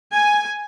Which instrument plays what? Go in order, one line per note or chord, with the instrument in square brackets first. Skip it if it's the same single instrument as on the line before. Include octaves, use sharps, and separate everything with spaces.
[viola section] G#5